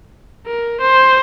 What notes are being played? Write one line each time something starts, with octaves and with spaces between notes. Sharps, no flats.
A#4
C5